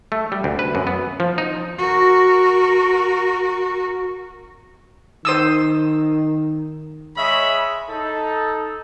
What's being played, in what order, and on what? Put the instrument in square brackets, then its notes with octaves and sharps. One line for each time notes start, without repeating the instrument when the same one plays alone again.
[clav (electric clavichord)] A3
G3
D2
B4
F#2
B3
F3
D#4
[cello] F#4 A#4
[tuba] D#3 [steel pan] C5 D#6 E6
[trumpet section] G#3 C#5 D#5 E5 B5
D#4 A4